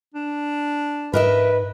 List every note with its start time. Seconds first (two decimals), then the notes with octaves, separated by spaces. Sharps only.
0.15 D4
1.14 G#2 A#4 B4 D#5 E5